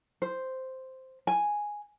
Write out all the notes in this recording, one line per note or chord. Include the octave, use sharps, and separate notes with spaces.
C5
G#5